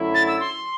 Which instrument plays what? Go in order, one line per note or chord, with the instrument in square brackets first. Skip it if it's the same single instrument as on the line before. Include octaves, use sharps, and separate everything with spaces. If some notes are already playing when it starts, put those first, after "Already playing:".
Already playing: [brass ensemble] F#2 D3 F#3 A3 E4
[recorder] A6
E6
C6